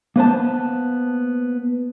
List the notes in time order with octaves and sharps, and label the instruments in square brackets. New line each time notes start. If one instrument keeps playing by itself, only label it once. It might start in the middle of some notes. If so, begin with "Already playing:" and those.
[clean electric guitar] A#3 B3 C5 A5